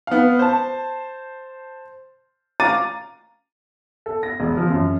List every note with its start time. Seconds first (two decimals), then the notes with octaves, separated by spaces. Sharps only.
0.07 B3 F5
0.39 C5 A5
2.60 F5 A#5 D6 A6 D#7
4.06 A4
4.23 A#6
4.40 E1
4.57 F3
4.70 F#2